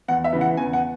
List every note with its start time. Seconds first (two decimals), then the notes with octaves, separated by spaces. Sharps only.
0.08 E2 F#5
0.24 E5
0.33 C#3 E3
0.41 F#5
0.57 E2 G#5
0.73 F#5